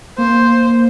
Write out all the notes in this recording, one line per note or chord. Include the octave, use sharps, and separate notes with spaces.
A#3 C5